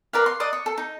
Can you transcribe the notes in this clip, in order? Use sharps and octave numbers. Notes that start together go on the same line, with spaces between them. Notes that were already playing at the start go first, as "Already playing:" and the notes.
A#4 B4 D5 F5
C6
B4 D5 D#5 D#6
C#5
A4
D#4